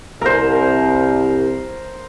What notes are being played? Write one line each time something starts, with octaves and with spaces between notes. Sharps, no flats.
C2 A#4 C5